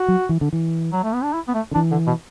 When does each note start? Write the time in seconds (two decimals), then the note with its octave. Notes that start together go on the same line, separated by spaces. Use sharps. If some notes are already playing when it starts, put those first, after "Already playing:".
Already playing: F#4
0.08 F#3
0.29 E3
0.41 D3
0.53 E3
0.93 F#3
1.04 A3
1.14 B3
1.24 D4
1.34 E4
1.48 B3
1.54 A3
1.71 D3
1.75 E3 D4
1.91 D3
2.07 B2